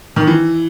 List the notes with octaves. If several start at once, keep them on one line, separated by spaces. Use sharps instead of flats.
D#3
E3